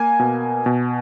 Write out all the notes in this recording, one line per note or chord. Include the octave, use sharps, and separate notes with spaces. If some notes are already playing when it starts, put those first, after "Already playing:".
Already playing: A#3 G#5
B2
B2